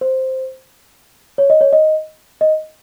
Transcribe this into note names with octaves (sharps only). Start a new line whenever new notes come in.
C5
C#5
D#5
C#5
D#5
D#5